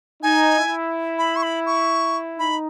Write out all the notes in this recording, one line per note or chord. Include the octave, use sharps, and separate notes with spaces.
D#4 G#5
E4
B5
C#6
B5
C#6
D#4 B5